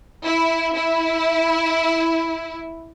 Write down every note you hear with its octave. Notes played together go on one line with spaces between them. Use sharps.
E4
E4